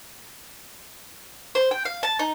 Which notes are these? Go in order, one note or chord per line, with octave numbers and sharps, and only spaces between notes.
C5
G5
F5
A5
D#4